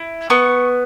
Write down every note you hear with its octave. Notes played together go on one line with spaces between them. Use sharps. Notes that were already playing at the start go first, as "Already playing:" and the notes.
Already playing: E4
B3 C#6